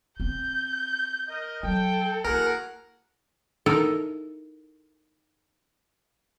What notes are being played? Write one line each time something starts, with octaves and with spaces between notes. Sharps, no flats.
C4 G6
A#4 D#5
F#3 A4 G5
A#3 E4 F#4 G#4 A#4 F#5
D#4 E4 A4 A#4